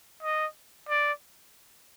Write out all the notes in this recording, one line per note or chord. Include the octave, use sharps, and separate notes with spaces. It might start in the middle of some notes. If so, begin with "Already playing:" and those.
D#5
D5